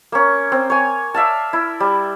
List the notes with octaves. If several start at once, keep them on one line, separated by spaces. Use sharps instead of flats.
A#3 C#4
C4
C#5 G#5
D5 E5 F5 A5
E4
G3